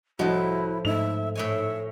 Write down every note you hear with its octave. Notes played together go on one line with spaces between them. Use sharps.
C2 A2 F3 E4 F#4 D#5
G#2 A3 D#4 E5 F7
A2 C#5 E5 G#5